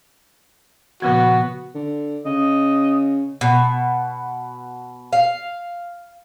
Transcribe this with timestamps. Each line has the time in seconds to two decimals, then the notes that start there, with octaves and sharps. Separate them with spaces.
1.02 A#2 C#3 F3 B3 F#4
1.75 D3
2.26 C#3 D#5
3.41 B2
5.13 F5